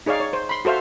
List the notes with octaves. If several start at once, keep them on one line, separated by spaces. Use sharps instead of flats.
D#4 G#4 C#5 D5 F5
C#5
C5
B5 C6
F#4 A4 C5 E5 F5